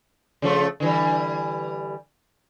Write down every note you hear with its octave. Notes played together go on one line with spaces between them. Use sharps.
C#3 F3 A3
D3 E3 G3